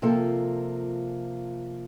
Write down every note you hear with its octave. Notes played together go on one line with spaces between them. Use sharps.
C3 F3 A#3 C4 F4 A4